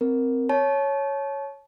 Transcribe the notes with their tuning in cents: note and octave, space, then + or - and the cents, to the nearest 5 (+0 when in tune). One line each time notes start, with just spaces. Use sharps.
C4 +0 A#4 +0
C#5 +0 A5 -30